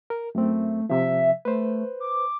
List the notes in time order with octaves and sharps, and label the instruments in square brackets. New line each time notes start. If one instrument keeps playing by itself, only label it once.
[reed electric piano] A#4
[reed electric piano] F#2 C4 [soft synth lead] A3
[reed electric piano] C3 F3 [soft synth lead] E5
[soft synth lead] A3 [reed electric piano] B4 C5
[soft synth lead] D6